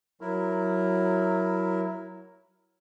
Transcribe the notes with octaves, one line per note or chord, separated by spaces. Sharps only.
F#3 E4 A#4